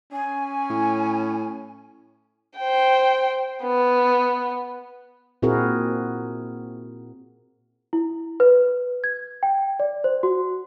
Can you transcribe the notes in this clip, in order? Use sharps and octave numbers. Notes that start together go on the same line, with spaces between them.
C#4 G#5
A2
C5 G5
B3
A#2 C4 E4 F#4 G#4 A#4
E4
B4
G#6
G5
D5
C5
F#4